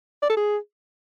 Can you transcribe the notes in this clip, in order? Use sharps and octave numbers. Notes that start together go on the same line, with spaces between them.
D5
A4
G#4